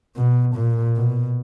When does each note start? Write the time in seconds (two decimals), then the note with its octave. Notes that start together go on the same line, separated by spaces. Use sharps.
0.16 B2
0.56 A#2
0.97 B2